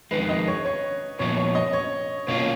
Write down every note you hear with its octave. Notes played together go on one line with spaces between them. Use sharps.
F2 D#3 G#3 B4
D#5
C#5
C#5
A#2 F3 B3 C#5
C#5
D#5
C#5
B2 A#3 C#4 F4 C#5